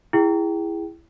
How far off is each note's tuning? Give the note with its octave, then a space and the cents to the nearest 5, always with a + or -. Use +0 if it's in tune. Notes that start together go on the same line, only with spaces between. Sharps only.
E4 +15 G#4 -15 G5 -10